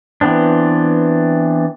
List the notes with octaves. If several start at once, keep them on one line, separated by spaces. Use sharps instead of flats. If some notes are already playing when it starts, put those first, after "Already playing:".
E3 B3 C4 D4